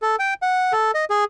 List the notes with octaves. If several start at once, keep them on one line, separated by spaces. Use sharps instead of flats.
A4
G5
F#5
A4
D#5
G#4